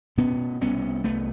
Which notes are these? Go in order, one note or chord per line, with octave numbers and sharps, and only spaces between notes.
B2 B3 C#4
C2 B3 C#4
C2 A3 B3